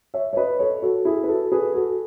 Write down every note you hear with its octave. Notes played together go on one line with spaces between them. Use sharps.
C#5 E5
C#5
B4 D#5
A4 C#5
F#4 A4
E4 G#4
B4
F#4 A4
G#4 B4
F#4 A4